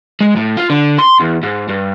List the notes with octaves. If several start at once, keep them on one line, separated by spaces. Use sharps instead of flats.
G#3
A2
F4
D3
C6
E2
G#2
G2